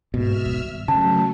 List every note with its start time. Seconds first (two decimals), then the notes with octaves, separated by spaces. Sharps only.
0.14 G#2 B2 E5 E6 F6
0.45 D#3 G3
0.88 C#3 F#3 A3 A5